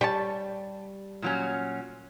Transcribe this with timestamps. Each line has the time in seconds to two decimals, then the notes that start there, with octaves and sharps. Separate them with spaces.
0.01 G3 G4 C#5 A5
1.22 A#2 F#3 C#4